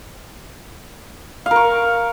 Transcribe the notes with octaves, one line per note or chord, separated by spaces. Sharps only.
A#4 F5 C#6